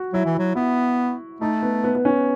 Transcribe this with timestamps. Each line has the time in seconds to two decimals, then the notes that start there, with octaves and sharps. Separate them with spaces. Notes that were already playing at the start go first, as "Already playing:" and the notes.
Already playing: F#4
0.13 F#3 E4
0.26 E3
0.35 E4
0.39 F#3
0.55 B3 E4
1.40 A3 D#4
1.62 B3
1.84 B3
1.95 B3
2.05 C#4